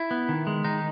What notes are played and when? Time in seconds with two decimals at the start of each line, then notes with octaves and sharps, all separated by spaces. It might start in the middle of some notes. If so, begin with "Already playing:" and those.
Already playing: E4
0.11 B3
0.29 D#3
0.47 G#3
0.64 D#3 D#4